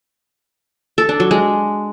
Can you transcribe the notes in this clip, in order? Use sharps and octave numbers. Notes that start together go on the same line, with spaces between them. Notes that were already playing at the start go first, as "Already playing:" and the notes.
A4
D4
F#3
G#3